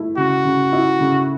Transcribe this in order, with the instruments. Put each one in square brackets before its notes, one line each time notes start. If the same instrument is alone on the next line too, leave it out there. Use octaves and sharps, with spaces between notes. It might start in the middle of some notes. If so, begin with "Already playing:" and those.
Already playing: [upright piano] A3 E4
[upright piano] C#3 [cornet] F#4
[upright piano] C#3
E4
C#3